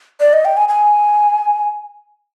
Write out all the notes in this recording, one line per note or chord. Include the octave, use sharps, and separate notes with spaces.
D5
D#5
G5
G#5
G#5